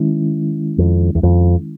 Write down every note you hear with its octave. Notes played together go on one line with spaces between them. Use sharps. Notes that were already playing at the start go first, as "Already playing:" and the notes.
Already playing: D#3 G#3 C#4 E4
F2
E2
F2